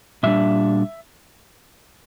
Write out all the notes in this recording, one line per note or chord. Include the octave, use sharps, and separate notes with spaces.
A#2 G3 D4 E5